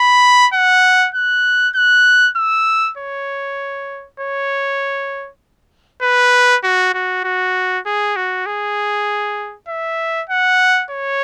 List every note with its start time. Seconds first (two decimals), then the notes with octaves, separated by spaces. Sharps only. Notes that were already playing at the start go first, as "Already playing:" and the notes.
Already playing: B5
0.54 F#5
1.15 F#6
1.75 F#6
2.37 E6
2.97 C#5
4.20 C#5
6.02 B4
6.64 F#4
6.94 F#4
7.24 F#4
7.86 G#4
8.16 F#4
8.46 G#4
9.68 E5
10.29 F#5
10.91 C#5